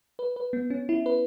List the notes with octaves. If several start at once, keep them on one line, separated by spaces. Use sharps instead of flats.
B4
B4
B3
C#4
E4
B4